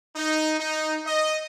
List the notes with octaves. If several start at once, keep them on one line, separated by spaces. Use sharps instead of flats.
D#4
D#4
D#5